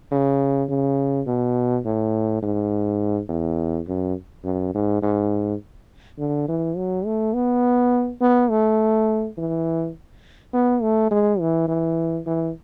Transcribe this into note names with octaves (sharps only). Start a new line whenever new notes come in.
C#3
C#3
B2
A2
G#2
E2
F#2
F#2
G#2
G#2
D3
E3
F#3
A3
B3
B3
A3
E3
B3
A3
G#3
E3
E3
E3